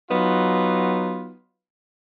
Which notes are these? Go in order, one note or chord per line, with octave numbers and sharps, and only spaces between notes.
F#3 B3 D#4 F4